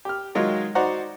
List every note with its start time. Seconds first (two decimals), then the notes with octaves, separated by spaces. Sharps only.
0.05 G4 F6
0.35 D#3 F#3 G#3 F4
0.75 D#4 F#4 C5 D5 F#5 A#5